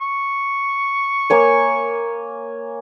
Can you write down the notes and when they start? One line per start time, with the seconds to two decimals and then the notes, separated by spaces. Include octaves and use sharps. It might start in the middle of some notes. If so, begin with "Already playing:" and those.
0.01 C#6
1.30 A#3 C#5 G#5